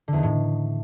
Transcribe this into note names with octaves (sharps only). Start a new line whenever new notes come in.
D3
E2
D#3
A2